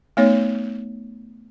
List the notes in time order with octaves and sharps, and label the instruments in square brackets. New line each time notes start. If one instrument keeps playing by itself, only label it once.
[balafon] A3 B3 D#4 C#5